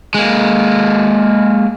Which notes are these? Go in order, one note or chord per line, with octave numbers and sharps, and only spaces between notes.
G#3 A#3